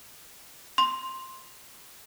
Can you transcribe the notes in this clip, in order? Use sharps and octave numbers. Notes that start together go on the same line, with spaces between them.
C6